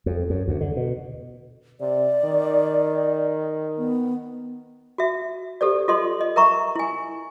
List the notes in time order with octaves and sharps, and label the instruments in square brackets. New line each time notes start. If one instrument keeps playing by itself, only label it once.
[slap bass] F2
F#2
D2
D3
B2
[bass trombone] C3 [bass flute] D5
[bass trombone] D#3
[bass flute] B3
[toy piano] F#4 E5
G4 A4 C5 D5
F4 A4 D#5 C6
D#5
A#4 E5 A#5 C#6
E4 G#5